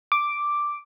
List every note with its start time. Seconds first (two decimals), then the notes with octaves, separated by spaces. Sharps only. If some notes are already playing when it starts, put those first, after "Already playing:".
0.12 D6